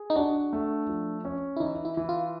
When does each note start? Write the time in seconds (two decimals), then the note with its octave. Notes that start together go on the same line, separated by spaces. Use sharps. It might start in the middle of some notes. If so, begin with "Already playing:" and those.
Already playing: G#4
0.10 D#4
0.16 D4 F#4
0.53 A3
0.89 F3
1.25 C#4
1.57 E4
1.60 E3 D#4
1.85 E4
1.97 E3
2.09 F4